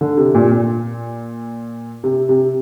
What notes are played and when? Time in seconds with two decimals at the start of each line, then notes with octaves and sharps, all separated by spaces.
0.01 D3
0.17 C3
0.35 A#2
0.51 A#2
2.04 C3
2.29 C3